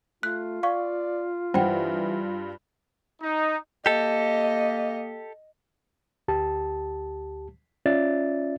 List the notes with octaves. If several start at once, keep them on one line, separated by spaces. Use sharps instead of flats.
A3 F4 F#6
D5 F5 C#6
G2 E3 C5 F#5 G5
D#4
A#3 G4 A4 D#5
D2 G4 A5
C#4 F4 D5 E5 A6